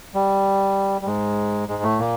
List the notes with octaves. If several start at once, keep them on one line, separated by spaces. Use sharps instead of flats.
G3
G3
G#2 G#3
G#2 G#3
A2 A3
A#2 A#3